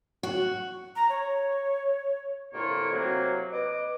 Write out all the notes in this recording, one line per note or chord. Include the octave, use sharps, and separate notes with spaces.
F#4
A#5
C#5
C2 A2 D3 A#3 F4 C#5
C3 F#3 A#3
B4 D#5 D6